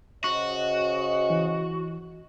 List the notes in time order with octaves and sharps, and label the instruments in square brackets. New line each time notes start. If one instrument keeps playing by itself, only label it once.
[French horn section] C#3 C5 D#5 [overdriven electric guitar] F#4 [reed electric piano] C#6
[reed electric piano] E3